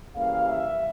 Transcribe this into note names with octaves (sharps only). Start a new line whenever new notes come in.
C#3 E3 G3 A#3 F5
E5